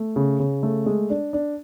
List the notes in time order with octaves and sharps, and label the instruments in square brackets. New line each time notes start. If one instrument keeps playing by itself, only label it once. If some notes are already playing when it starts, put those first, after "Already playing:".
Already playing: [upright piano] A3
C#3
C#3
A3
G#3
D4
D4